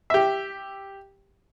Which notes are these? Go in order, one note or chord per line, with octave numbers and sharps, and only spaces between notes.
G4 E5